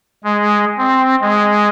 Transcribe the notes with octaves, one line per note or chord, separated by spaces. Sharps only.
G#3
C4
G#3